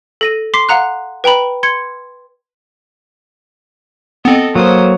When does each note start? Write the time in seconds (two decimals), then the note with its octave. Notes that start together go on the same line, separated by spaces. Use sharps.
0.21 A4 A#6 D#7
0.54 C6 D6 B6 C7
0.69 F5 F#5 A#5 F#6
1.24 B4 G5 A#5 B5
1.63 C6 G#6 C#7
4.25 B3 C4 A4 D#5
4.55 F#3 A#3 C5 D#6